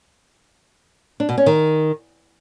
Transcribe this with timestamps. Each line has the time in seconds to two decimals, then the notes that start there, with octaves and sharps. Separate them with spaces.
1.20 D4
1.29 B2
1.38 C#4
1.46 D#3